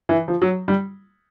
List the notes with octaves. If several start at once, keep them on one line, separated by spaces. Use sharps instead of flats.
E3
F3
F#3
G3